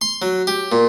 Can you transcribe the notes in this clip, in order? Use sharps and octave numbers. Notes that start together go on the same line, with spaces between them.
C6
F#3
G4
A#2